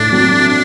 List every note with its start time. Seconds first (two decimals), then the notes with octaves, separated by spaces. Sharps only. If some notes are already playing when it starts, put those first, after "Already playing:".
Already playing: A2 D4
0.12 F#3 C4
0.49 D4